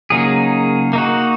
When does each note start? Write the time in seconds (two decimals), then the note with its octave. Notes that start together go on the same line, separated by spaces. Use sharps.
0.10 C#3 F#3 A#3 D#4 G#4
0.93 A#3 D#4 F#4